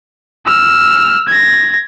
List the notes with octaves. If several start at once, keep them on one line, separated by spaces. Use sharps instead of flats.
E6 F6
G#6 A#6